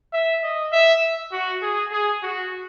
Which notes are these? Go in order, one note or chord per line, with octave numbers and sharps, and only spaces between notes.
E5
D#5
E5
F#4
G#4
G#4
F#4